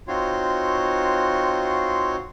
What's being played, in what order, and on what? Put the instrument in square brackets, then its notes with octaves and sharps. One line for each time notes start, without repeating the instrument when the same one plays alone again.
[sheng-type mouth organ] C4 D#4 F4 F#4 C#5 C6